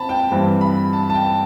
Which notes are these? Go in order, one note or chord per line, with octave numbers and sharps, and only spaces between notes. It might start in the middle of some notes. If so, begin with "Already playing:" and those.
Already playing: C3 C4 A5 B5
G5
G2 E3 G3 C4
B5
A5
A5
G5